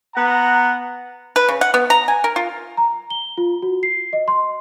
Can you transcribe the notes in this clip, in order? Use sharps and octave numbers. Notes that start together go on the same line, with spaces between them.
B3 F#5 A#5
B4
C#3
F#5
B3
A#5
G#5
A#4
F4
A#5
G7
F4
F#4
C7
D#5
C6